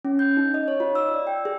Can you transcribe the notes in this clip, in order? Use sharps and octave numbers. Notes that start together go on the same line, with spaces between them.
C#4
G6
D#4
D#5
C#5
F4
E6
D5
G5
G#4